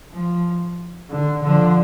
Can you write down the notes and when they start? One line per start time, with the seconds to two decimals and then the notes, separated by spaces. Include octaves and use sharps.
0.13 F3
1.10 D3
1.43 D3 F3